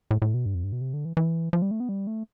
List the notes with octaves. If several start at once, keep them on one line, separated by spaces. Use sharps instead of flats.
A2
A2
B2
G2
F2
G2
B2
C3
D3
E3
E3
F3
G3
A3
B3
G3
A3